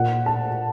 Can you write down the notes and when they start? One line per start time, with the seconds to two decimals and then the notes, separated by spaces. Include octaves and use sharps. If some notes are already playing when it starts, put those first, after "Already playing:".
Already playing: A#2 F#5
0.26 A5